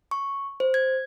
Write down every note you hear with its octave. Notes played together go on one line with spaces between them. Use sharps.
C#6
C5
G#6